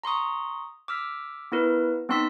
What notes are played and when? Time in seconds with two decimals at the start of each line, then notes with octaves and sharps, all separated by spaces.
0.04 A#5 C6 C#6 D#6
0.88 D6 E6 F6 B6
1.52 B3 E4 A#4 B4
2.09 B3 C4 D#4 C6 E6 B6